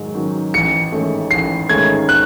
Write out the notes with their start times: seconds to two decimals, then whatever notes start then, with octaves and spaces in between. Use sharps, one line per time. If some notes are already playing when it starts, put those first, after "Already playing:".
Already playing: G#2 D#3 F#3
0.15 D#3 F#3 C#4
0.54 A1 C#7
0.92 G#2 D#3 A3 C#4
1.31 A1 C7
1.69 G#2 D#3 A3 C#4 G#6
2.09 F#6